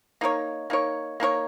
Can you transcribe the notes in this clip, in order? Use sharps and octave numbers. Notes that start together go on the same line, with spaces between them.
A#3 D#4 A#4 C#5
A#3 D#4 A#4 C#5
A#3 D#4 A#4 C#5